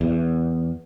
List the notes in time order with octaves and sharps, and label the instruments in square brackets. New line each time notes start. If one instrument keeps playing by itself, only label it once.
[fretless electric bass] E2